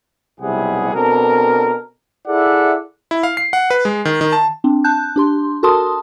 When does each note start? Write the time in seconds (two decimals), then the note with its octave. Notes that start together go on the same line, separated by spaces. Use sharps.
0.40 B1 C3 G3 E4 G#4 F#5
0.94 B2 C4 D4 A4 A#4
2.28 E4 G#4 A4 D5 E5 F#5
3.11 E4
3.23 F5
3.37 C7
3.53 F#5
3.70 B4
3.85 G#3
4.05 D#3
4.21 D#3
4.33 A5
4.64 C4 D4
4.84 A5 F#6 G6
5.16 D4 G4 C6
5.63 F#4 A4 A#4 A5 C6 D#6